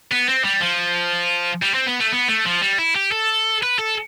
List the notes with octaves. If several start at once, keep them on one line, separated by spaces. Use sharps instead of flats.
B3
C4
G3
F3
G3
C4
B3
A3
B3
A3
F3
G3
E4
G4
A4
B4
A4